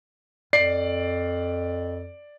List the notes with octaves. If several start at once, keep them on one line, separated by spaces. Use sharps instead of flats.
F2 D5 C7